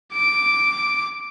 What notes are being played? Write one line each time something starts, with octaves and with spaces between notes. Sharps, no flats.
D6 D7